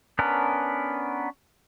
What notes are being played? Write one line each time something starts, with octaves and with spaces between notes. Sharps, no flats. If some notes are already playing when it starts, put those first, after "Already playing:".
B3 C#4 D4 A#4 B4